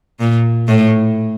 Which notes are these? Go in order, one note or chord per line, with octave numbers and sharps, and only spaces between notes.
A#2
A2